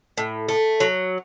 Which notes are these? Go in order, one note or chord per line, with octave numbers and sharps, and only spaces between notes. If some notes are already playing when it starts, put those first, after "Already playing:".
A2
A3
F#3